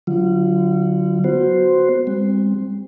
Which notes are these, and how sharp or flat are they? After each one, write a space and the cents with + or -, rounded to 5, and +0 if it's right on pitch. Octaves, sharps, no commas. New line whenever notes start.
D3 +0 F#3 +0 F4 -35
B3 +0 F#4 +0 C5 +0
G3 +45 C4 +0